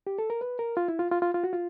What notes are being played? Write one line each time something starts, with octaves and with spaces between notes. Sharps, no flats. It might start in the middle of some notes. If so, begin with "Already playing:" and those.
G4
A4
A#4
B4
A#4
F4
E4
F4
F4
F4
F4
F#4
F4